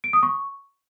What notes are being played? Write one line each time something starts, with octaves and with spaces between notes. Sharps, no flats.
D7
D#6
C#6